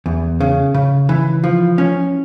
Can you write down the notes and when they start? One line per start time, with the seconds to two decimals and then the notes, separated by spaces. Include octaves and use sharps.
0.06 E2
0.40 C#3
0.74 C#3
1.09 E3
1.44 F3
1.78 C#4